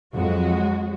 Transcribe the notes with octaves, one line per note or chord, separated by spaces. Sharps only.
F2 F#3 G#3 F#4